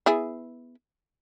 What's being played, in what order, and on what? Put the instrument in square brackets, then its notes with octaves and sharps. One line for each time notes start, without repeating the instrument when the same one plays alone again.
[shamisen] B3 E4 G#4